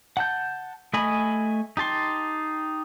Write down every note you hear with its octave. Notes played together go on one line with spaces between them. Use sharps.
F#5 A5 G6
A3 D#5 G#5 B5
D#4 G4 A5 C6